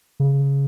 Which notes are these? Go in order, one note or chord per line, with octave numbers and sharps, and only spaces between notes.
C#3